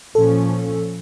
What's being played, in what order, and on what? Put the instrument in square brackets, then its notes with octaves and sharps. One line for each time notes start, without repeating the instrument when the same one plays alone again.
[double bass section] A#2 F3 C#4 [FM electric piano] A4